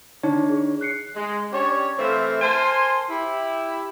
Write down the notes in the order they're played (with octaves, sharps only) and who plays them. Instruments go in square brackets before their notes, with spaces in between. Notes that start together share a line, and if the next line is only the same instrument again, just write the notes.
[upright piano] D#3 [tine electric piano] D4 C#5
[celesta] G#4
F#6 C7 C#7
[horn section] G#3
C#4 D4 G4 C#5
E3 A3 C4 C5 E5 F5
A#4 C5 G#5 A5 C6
E4 G4